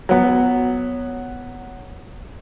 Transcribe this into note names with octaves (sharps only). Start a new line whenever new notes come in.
F#3 B3